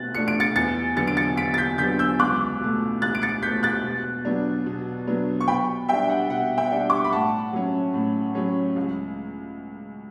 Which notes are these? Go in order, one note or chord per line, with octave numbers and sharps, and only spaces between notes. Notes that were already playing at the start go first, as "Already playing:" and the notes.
Already playing: B2 A3 F#6 A6
A3 D4 C#7
D7
A6 C#7
E2 A6 C#7
D3 F#3 B3 A6 C#7
D7
A6 C#7
E2 B6 D7
A6
G6 B6
D3 F#3 B3 G6 B6
E6 G6
C#2 D6 F#6
B2 A3
C#2 F#6 A6
D7
A6 C#7
B2 A3 G6 B6
F#6 A6
B2
F#3 B3 D4
B2
F#3 B3 D4
C#6
B2 G5 B5
G3 D4 E5 G5
F#5
B2 F#5
E5 G5
G3 D4
D6
C#6
B5
A2 F#5 A5
F#3 C#4
A2
F#3 C#4
C#2